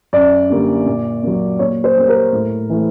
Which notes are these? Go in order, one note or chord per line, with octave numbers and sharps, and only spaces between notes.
F#2 D5
D3 G3 A#3
A#2
F#3 A#3
A#2 C#5
C5
G3 A#3
A#4
A2
E3 A3